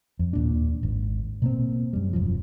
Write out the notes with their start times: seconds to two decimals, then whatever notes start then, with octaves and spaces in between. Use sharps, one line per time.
0.19 F2
0.33 D#2 A#2 D4
0.83 G#1
1.42 B2 A#3 C4
1.93 F#2 G3
2.13 E1 F#2 F3